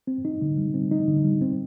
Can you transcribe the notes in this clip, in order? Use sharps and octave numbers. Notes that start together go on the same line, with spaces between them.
C4
D#4
D3
G3
C4
D#4
D3
G3
C4